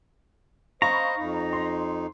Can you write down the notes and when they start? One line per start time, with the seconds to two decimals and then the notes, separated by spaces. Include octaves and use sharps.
0.82 C5 D#5 F5 A#5 B5 C#6
1.18 F2 D#4
1.53 C6